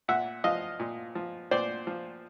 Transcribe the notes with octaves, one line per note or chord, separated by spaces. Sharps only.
A#2 E5 F#5
F3 D#5 F5
A#2
F3
A#2 C5 D5
F3